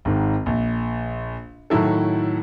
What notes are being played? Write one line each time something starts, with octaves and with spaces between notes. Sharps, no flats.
G#1 G#2 D#3
A#1
A2 D#3 F#3 E4 A4